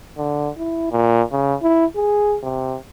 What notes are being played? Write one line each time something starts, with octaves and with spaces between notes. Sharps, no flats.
D3
E4
A#2
C#3
E4
G#4
C3